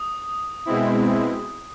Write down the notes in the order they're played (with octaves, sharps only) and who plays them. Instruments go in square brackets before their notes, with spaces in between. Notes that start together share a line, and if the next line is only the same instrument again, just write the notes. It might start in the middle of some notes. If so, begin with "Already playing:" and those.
Already playing: [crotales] D#6
[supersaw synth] B2 G#3 C4 E4